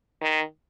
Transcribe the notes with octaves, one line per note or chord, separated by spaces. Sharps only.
D#3